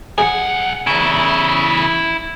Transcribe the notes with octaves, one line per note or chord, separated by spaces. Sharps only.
B1 G#4 F#5
E2 C#3 E4